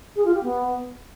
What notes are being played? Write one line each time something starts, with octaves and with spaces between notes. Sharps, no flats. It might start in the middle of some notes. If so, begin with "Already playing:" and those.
G#4
F4
G4
B3